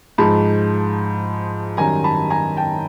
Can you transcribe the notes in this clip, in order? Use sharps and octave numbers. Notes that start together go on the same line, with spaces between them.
G#2 F3 G#3 A5 B5
F#2 D#3 G3 G#5 A#5
A5 B5
G#5 A#5
G5 A5